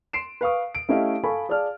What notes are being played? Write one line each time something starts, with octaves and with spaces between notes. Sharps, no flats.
C6 C7 D7 E7
B4 F5 C#6 D#6
D7
A3 C#4 E4 G4 D#5 F5
A4 F5 G#5 A5 B5 C#6
G#4 D5 F5 A5 F6